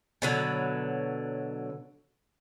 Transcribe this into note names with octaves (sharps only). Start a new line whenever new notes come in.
B2 D3 F#3